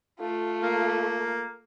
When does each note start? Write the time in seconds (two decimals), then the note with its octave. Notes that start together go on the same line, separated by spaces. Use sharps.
0.20 A3 F4
0.63 A#3